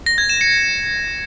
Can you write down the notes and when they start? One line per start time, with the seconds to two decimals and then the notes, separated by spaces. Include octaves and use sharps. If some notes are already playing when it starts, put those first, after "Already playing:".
0.06 A#6
0.18 G#6
0.29 E7
0.41 C#7